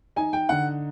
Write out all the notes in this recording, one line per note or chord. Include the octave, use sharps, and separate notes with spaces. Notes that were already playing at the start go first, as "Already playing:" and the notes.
D#4 G#5
G5
D3 F#5